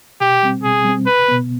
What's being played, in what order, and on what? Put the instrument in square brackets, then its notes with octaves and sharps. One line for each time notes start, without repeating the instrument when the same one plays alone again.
[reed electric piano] B2 [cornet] G4
[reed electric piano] G3 C4
[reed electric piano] B2 [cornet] G#4
[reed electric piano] G3 C4
[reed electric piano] C2 [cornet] B4
[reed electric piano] B2 B3